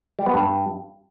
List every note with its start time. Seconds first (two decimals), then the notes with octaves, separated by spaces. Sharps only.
0.19 G3
0.26 B3
0.34 G2